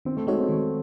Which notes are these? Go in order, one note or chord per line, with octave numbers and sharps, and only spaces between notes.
D#3 C4
A3
G#3 A3 D#4 F#4 C#5
C4
D#3